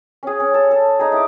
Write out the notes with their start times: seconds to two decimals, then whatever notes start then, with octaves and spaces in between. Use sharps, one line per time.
0.23 C#4 G#4
0.40 C#4
0.54 A4
0.71 A4
0.99 D#4 G#4
1.12 E4 G#5 D6